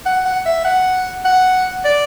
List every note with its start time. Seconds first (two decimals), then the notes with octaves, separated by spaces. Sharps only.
0.06 F#5
0.25 F#5
0.46 E5
0.64 F#5
1.25 F#5
1.84 D5